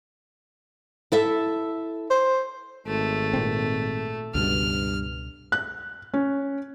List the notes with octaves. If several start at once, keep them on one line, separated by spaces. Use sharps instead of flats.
E4 A4 E5
C5
G#1 A3
A#2 C4
C#2 G2 B2 F6
F#6
C#4